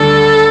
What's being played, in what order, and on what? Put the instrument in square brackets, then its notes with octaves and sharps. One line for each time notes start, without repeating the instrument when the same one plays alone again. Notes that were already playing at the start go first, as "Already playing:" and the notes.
Already playing: [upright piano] D2 D3 G3 D4 [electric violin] A4